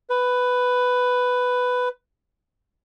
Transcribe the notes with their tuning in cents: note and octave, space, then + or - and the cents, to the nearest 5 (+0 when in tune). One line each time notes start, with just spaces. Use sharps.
B4 +10